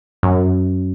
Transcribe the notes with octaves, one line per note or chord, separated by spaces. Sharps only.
F#2